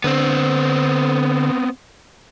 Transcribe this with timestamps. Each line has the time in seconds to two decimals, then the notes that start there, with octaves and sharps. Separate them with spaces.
0.04 D3 B3 C4